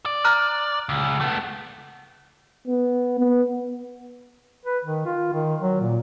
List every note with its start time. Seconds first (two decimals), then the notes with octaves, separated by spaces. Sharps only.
0.06 D5
0.25 A#5 F6 F#6
0.89 C#2
1.21 A3 B3
2.67 B3
3.19 B3
4.65 B4
4.85 D#3
5.06 F4
5.33 D#3
5.61 F#3
5.81 A#2